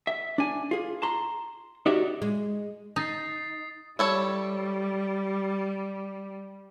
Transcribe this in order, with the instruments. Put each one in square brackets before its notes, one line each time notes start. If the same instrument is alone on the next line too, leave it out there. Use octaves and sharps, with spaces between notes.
[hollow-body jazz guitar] E5
D4 G#5
F4 G#4
A5 A#5 C6
D#4 F#4 G4 C#5 D5 E5
[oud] G#3
[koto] D#4 [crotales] D#6 A6 C7
[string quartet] G3 [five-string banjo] E4 A4 C#5